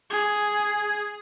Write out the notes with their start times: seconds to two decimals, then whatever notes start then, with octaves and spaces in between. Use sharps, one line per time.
0.10 G#4